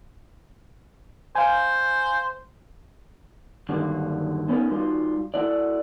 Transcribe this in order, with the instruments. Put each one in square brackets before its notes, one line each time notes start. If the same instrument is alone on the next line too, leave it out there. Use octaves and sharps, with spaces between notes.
[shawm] C5 [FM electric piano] F5 G#5
[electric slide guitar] G2 D3 D#3 F#3 G3 A#3
A3 B3 C#4 D#4 G4 A#4
G3 D#4 F4 F#4
A3 E4 F#4 D5